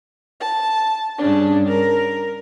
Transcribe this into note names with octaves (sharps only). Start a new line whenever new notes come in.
A5
G2 C#3 D4
A#4